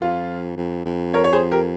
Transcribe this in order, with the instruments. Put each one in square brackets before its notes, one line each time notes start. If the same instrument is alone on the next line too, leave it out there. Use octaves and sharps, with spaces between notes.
[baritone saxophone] F2 [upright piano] F4
[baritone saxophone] F2
F2
[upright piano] A#4 C#5
C#5
G#4 C5
G4 A#4